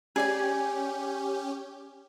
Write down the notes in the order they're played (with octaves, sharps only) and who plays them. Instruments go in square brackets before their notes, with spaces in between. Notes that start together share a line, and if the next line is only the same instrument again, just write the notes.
[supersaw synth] C#4 G4 [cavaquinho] G#4 D5 G#5